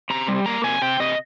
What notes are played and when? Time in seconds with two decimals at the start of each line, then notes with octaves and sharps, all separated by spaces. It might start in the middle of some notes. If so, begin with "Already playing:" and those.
0.10 C3 A#5
0.28 G3
0.46 A#3 A#5
0.64 C3 G#5
0.82 C3 G5
1.00 C3 D#5